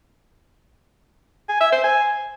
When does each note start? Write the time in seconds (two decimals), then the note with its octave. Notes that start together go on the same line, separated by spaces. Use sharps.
1.49 G#5
1.60 E5
1.72 C5
1.84 G#5